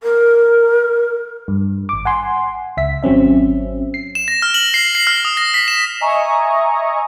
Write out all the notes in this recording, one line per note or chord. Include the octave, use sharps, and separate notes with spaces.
A#4
G2
G#1 D6
F#5 G#5 C6
C#2 E5 B6
G#1 F#3 C4 C#4 E5
C7
E7
A#6
F6
F#7
C7
C7
F6
D#6
A#6
B6
E7
D#5 E5 G#5 A#5 C#6 D#6